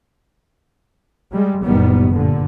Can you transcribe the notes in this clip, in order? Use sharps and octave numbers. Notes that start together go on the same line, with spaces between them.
G3 G#3
F#1 A#2 D#3 G3 B3
G2 A#2 D3